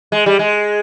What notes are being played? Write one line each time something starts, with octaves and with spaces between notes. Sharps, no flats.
G#3
G3
G#3